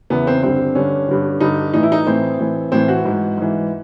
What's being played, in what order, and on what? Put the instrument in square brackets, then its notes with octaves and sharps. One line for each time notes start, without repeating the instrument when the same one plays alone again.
[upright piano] E2 C#3 E3 B3
C4
G2 D3 C4
G2 D3 C#4
G2 D3
G2 D3 D#4
A2 E3 D#4
E4
D#4
A2 E3 C4
A2 E3
A2 E3 C4
F#4
G#2 E3
G#2 E3